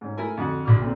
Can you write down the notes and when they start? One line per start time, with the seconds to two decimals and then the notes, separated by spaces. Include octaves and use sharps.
0.01 G#2 C#4
0.18 A3 E4 A#4 G#5
0.37 F2 D3 F#4 F#5
0.65 A#1 D3 F#4 D6 F6
0.81 A#2 D3 C4